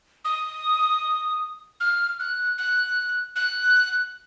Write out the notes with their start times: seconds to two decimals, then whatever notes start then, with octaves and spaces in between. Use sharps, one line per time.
0.25 D#6
1.80 F6
2.20 F#6
2.58 F#6
3.36 F#6